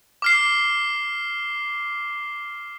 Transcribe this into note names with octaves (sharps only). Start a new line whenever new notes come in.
D6 F6 C7